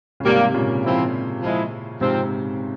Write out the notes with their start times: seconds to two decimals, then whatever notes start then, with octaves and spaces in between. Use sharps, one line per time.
0.20 C#3
0.25 G#2 C3 G3 A#3 F4
0.54 A#2 C#3
0.84 F3 C4 E4
1.42 F3 G#3 E4
2.00 G#2 C3 F3 C4 F4